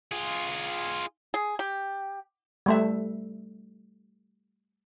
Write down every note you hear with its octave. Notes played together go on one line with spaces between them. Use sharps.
F4 G#4
G#4
G4
G3 A3 E5